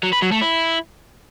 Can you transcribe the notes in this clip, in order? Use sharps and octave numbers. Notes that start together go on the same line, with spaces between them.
F#3
B4
F#3
A3
E4